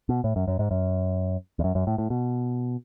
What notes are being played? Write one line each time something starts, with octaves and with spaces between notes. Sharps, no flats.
B2
A2
F#2
F#2
G#2
F#2
E2
F#2
F#2
A2
A2
B2